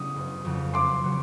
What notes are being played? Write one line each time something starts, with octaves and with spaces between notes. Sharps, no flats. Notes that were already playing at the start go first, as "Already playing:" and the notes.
Already playing: C#3 F#3 B3 D#6
F#1
F2 C#3 F#3 B3
F#1 C6 D6
C#3 F#3 B3